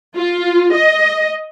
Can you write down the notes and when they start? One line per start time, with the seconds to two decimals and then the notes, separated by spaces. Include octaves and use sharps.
0.14 F4
0.73 D#5